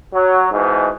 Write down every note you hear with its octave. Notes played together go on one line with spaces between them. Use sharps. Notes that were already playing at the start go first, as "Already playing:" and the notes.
F#3
G#2 B2 E3